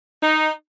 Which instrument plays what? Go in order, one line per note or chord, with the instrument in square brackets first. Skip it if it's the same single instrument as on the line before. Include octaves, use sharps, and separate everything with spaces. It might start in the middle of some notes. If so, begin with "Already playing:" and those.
[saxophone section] D#4